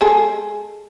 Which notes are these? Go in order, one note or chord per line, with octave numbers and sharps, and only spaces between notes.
G#3 G#4 A4